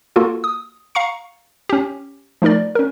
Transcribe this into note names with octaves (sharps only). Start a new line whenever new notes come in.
A#3 F4 F#4 A4 A#4
D#6
F5 A#5 C#6 C#7
C#4 G4
F3 A3 D#4 A#4 D5
C#4 A#4